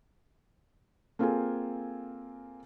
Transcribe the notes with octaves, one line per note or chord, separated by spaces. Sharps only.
A#3 C4 F4 G#4 A4 G#5